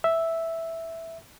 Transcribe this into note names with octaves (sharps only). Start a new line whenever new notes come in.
E5